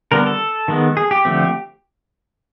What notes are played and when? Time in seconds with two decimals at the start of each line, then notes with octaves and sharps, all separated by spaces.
0.12 D3 G3 B3 A#4
0.26 A4
0.68 D#3 G#3 B3
0.97 G#4
1.11 G4
1.25 D3 F3 A3 C4